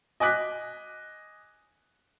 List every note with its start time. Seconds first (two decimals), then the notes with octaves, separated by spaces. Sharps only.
0.20 D#5 G#5 D6 F#6 B6